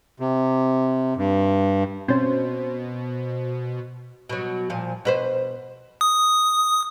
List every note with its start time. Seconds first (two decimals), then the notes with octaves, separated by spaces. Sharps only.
0.20 C3
1.17 G2
2.08 B2 C4 C#4 C5
4.29 B2 F#3
4.70 A#2 F3
5.05 B2 B4 C5
6.01 D#6